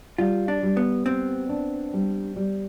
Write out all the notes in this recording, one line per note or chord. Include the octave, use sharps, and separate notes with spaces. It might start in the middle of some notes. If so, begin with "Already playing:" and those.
G3 F4
D4
G3
B3
B3 C4
D4
G3
G3